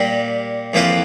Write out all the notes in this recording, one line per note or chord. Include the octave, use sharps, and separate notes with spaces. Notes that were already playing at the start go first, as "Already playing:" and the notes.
Already playing: A#2 G3 A#3
F2 E3 A#3 F4 C5